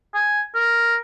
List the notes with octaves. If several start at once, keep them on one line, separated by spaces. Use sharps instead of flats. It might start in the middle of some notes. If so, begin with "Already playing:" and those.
G#5
A#4